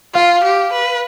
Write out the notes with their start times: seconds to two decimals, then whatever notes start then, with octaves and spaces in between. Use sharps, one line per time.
0.15 F4 F5
0.44 G4
0.73 B4